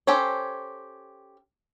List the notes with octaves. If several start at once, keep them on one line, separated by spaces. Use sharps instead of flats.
C#4 G4 A4 C5 C#5